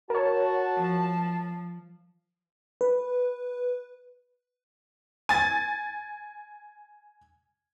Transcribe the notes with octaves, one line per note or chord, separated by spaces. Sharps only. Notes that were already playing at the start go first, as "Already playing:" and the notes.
F#4 A#4 C#5 A5
F3
B4
G#5 A6